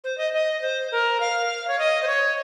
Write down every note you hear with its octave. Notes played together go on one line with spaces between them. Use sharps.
C5
D#5
D#5
C5
A#4
F5
C#5
D#5
C5
C#5